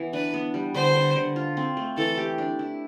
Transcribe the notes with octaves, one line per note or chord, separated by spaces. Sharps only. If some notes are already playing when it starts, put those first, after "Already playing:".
Already playing: E3 B3
D4 B4
B3
G3
D3 C5
D3
D3
F4
C4
A3
E3 A4
G4
D4
E4